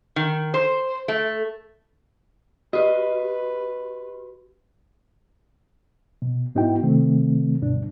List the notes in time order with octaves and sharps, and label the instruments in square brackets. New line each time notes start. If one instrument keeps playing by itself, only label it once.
[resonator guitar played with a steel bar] D#3
C5
A3
[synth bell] F#4 G4 [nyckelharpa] B4 [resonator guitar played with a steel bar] D#5
[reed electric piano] B2
G#2 B3 D#4 E4 F#4 G5
C3 D#3 A3 C4
D2 G2 B2 D4